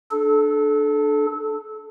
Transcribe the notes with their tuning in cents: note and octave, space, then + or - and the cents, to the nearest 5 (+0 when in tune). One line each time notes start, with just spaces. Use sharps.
D4 +15 A4 -25